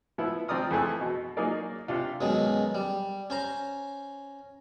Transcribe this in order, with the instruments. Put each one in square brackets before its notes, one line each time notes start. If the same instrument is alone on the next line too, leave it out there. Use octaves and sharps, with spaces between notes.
[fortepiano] F3 B3 E4
F3 C4 D5 A#5 D#6 F6
F2 E3 A3 G#4 A5 E6
B2
F#3 A#3 D#4 G#4 A#4 D5
C3 D4 F4
[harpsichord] F#2 B2 D#3 G#3
G3
C#4 C5 A#5